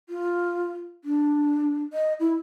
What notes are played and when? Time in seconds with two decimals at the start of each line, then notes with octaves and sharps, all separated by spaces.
0.09 F4
1.05 D4
1.93 D#5
2.20 E4